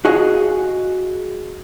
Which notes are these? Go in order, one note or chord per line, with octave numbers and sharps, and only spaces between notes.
F#4 G#4 D#5 F5